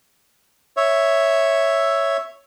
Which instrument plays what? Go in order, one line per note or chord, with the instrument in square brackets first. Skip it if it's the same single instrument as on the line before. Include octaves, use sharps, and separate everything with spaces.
[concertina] C#5 E5